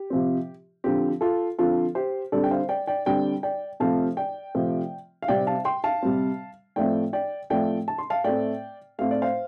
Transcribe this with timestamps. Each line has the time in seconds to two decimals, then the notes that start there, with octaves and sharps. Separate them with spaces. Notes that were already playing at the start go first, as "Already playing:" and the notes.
Already playing: G4
0.10 C3 F3 C4
0.84 D3 F3 C4 G4
1.21 F4 A4
1.58 D3 F3 C4 F4 A4
1.95 G4 C5
2.32 D3 G3 C4 A4 D5
2.44 G5
2.51 C5 F5
2.69 D5 G5
2.87 D5 G5
3.06 D3 G3 C4 D5 G5
3.43 D5 G5
3.80 C3 F3 A3 C4 F5 A5
4.17 D5 G5
4.55 C3 F3 A3 C4
5.22 F5
5.28 C3 G3 C4 D5 G5
5.47 F5 A5
5.65 G5 C6
5.84 F5 A5
6.03 C3 G3 C4
6.76 A2 F3 A3 C4 D5 G5
7.13 D5 G5
7.50 A2 F3 A3 C4 D5 G5
7.88 A5
7.98 C6
8.10 F5 A5
8.24 A2 A3 C4 D5 G5
8.99 A2 A3 C4 F5
9.11 D5
9.22 C5 F5